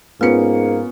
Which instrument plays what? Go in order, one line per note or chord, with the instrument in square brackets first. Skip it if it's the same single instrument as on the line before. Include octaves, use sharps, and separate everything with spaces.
[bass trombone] G#2 [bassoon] A#3 [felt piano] B3 C#4 C#7 [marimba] F4 B4